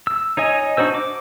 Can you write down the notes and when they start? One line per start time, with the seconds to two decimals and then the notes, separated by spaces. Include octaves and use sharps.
0.07 E6
0.37 D#4 C#5 D#5 G#5
0.77 D4 D#4 F#4 C5 E6
0.95 D6